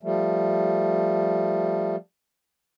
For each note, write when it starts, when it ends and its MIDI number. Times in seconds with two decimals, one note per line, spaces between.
0.03 1.96 53
0.03 1.96 55
0.03 1.96 57